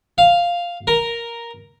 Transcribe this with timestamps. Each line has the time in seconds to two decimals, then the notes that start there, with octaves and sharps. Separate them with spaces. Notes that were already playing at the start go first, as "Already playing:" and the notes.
0.18 F5
0.87 A#4